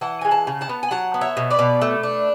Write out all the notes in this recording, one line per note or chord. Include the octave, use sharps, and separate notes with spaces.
E3 F#5 A5
G#3 G#5
F#5 A5
C#3
F#5 A5
B3
G#5
F#3 F#5 A5
B3
C#5 E5
B2
B4 D5
B2
A3
D4